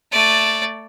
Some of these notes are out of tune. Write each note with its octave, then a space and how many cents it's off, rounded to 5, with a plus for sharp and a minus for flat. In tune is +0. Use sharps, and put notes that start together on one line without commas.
A3 +10 D5 +0